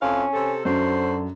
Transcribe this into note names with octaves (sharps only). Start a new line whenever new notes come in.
F2 C#4 E4 F5
C3 A4
F#2 D3 F#3 C5